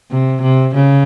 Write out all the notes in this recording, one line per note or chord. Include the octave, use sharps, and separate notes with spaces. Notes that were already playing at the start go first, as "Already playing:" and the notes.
C3
C3
C#3